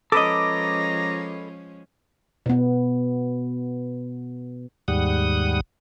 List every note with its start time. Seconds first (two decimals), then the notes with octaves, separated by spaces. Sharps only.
0.12 F3 G#3 C#4 A4 B4 D#5 A#5 D6
2.46 B2 B3
4.88 D#2 G#2 G3 F#5 D#6